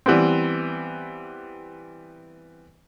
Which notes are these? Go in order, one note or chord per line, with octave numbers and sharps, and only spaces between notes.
E3 G3 B3 C4